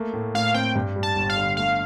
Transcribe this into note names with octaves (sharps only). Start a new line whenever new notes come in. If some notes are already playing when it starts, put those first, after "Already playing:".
Already playing: A3 A#3
A2
A2 F5
C4 G5
G2
G3
A5
G1
F5
D3
A3 F5